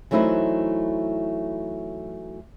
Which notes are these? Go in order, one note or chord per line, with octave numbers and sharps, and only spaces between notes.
E3 F#3 A3 D#4 E4 C5